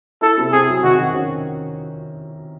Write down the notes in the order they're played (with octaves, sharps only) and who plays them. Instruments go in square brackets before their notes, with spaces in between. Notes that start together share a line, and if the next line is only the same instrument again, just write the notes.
[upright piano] E4 [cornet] A4
[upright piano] C3
[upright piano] C4 [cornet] G#4
[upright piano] F#3
[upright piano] D#3 [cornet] F#4
[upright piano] D#3
C#4